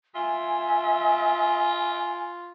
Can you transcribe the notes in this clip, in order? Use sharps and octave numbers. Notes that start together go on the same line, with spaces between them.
F4 E5 G#5